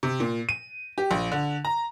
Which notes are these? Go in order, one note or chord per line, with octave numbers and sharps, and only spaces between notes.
C3
A#2
D#7
G4
A#1
D3
A#5